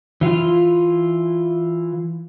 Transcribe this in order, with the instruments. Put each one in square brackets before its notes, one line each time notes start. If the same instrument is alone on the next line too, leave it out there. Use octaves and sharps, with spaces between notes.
[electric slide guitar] E3 F4